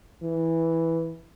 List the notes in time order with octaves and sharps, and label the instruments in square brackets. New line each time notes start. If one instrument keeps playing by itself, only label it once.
[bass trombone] E3